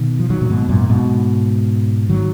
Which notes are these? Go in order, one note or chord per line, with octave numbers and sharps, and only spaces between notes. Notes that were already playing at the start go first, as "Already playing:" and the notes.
Already playing: B2 D#3
F3
D#3 F#3
A#2
G#2 B2
F#2 A#2
G#2 B2
D#3 F#3